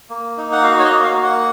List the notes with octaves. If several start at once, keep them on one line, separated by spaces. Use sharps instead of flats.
A#3
D#4
F#5
F#4 F5
C#5
D#5
A#3
F5
A#3
F#5